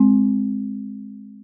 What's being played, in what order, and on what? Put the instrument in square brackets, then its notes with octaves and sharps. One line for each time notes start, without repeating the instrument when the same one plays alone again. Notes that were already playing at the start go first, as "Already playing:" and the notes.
Already playing: [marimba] G#3 C4